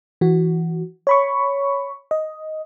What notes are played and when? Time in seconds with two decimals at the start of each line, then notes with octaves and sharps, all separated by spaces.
0.21 E3 F#4
1.07 C#5 B5 C#6
2.11 D#5